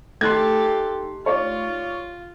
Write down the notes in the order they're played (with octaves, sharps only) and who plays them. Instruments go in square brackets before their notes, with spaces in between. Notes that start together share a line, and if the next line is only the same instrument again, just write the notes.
[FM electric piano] A3 D#4 [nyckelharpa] G4 A4 [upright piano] C6 F#6 G#6
[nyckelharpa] F4 [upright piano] C#5 D5